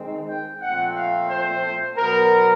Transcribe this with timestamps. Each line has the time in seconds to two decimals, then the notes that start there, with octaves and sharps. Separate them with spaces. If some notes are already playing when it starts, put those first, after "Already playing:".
Already playing: D#3 G#3 C4
0.28 G5
0.61 A#2 F3 A3 C4 F#5
0.96 F5
1.29 C5
1.97 B2 F#3 B3 A#4